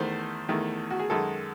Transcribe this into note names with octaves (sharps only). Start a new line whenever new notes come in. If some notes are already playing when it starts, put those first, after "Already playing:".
Already playing: E2 D#3 A3 C5
E2 D#3 A3
F#4
G#4
F#2 D#3 G#3 A4